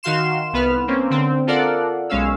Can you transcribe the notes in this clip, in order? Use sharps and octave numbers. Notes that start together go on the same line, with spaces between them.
D#3 F#4 F5 C6 E7
C2 B3 B4 F6
A#3 C4 C#4
D3 C4
F4 A4 A#4 D5 F5 F#5
B1 G#3 C#4 F5 E6